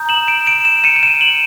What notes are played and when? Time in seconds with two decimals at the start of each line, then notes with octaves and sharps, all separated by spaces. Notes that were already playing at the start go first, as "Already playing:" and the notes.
Already playing: A#5 D#6 G6
0.09 E7 F#7
0.27 D7 E7
0.47 D7 E7
0.65 D7 E7
0.84 C#7 D#7
0.96 D#7
1.03 D7 E7
1.21 E7 F#7